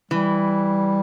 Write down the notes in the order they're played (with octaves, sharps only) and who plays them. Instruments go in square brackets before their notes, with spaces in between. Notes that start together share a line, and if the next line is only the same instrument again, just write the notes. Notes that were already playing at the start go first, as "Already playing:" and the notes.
[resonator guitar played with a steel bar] E3 [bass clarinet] G3